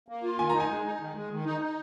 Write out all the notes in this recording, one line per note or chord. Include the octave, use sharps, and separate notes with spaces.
A#3
F4
D#3 G#5
D#4 A#5
G#5
G#3
D#4
D#3
G#3
D#3
D#4
D#4